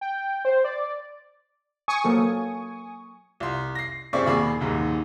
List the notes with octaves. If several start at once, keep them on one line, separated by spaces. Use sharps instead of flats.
G5
C5
D5
G#5 C#6 D#6
F#3 A#3 A4
C2 C6
A#6 C7
G2 C4 G#4 D5 E5 C#6
E1 D#2 G#4 B5 D6
D#1 D#2 G#2